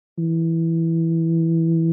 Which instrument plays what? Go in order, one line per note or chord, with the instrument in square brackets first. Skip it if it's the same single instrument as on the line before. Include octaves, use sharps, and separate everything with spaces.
[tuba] E3